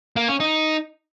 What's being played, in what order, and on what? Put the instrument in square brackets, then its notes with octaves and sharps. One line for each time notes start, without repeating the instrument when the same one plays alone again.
[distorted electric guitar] A#3
C#4
D#4